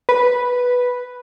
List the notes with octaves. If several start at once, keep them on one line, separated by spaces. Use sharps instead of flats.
B4